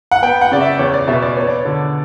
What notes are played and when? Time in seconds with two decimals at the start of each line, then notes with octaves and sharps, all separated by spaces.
0.11 F#5
0.22 B3 G5
0.41 F#5
0.52 C#3 D5
0.61 E5
0.79 E2 C#5
0.94 D5
1.08 B2 E5
1.22 D5
1.37 B3 C#5
1.47 D5
1.59 C#5
1.65 D3